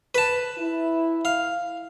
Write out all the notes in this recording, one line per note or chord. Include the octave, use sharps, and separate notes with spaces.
B4 A5
E4
F5